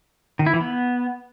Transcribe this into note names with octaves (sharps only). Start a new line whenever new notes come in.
D#3
E4
E3
B3